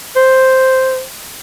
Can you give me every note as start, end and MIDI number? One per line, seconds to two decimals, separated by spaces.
0.16 1.03 72